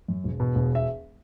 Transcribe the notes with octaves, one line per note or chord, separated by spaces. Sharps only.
F#2
E1
B2
E1
E5